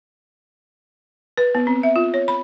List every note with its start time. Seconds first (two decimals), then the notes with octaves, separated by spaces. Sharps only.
1.37 B4
1.55 B3
1.67 C4
1.83 E5
1.96 F4
2.14 C#5
2.28 B5